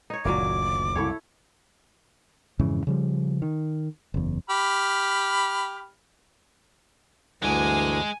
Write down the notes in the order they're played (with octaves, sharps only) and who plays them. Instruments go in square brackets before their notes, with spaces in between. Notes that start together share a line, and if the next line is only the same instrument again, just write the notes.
[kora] D#4 C#5
[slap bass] F#1 D2 D#3 [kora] A#2 F#3 A#4 [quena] D6
[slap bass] C2 F#2 C#3 [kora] E4 A4 C#5
[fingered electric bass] F2 G#2 C#3 E3
C#3 F3 G3
D#3
F#1 E2
[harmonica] G4 B5 F6
[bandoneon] D2 [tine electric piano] G2 D3 E3 [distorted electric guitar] G#3 [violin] G#5